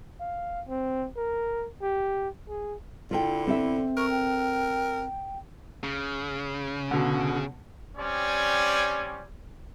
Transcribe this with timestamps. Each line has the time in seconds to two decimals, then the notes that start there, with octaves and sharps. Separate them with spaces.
0.20 F5
0.69 C4
1.17 A#4
1.82 G4
2.49 G#4
3.11 D3 E4 F4 A4 G5
3.47 C4 A4 E5
3.97 A#4 C#6
4.10 G5
5.83 C#3
6.91 B2 D3
7.97 G3 C4 C#4 D5 G#5